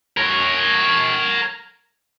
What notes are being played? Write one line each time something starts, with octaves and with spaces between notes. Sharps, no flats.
A#4 C#5